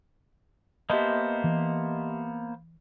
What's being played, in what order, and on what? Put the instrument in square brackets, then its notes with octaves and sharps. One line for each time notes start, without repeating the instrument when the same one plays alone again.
[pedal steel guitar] A#3 B3 C5 [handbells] G4 E5 A5 [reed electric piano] D#5
[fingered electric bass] E3